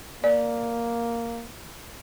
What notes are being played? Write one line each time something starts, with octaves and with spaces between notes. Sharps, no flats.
A#3 D5